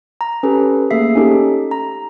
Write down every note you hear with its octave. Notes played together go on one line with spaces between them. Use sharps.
A#5
C#4 G4 A4 B4
A3 A#3 G#4 E5 C7
C#4 D#4 G4 A4
A#5